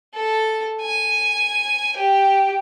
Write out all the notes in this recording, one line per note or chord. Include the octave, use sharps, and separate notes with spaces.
A4
G#5
G4